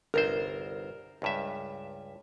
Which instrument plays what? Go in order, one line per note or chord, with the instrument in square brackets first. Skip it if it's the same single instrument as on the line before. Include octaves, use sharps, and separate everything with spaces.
[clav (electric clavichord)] G1 C2 C5 [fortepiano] A#4
[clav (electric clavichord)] C#2 G2 E5